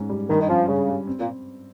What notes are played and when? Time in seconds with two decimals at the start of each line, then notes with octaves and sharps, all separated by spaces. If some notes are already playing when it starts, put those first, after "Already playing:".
Already playing: G#2 C#4
0.10 G3
0.29 G2 D#3
0.41 D#3
0.49 F3 C#4
0.68 G2 C#3
0.88 G3
1.07 C4
1.20 A#2